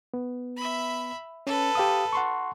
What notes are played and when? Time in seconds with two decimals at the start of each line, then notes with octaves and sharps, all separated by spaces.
0.14 B3
0.57 E5 B5
1.47 C#4 A4 B4
1.75 G4 F5 D#6
2.13 F#5 C6 C#6